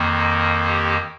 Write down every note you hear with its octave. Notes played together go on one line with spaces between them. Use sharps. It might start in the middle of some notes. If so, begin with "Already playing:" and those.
Already playing: F2 D#3 A#3
G4